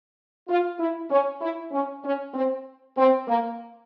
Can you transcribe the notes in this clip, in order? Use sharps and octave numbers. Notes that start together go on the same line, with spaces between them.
F4
E4
C#4
E4
C#4
C#4
C4
C4
A#3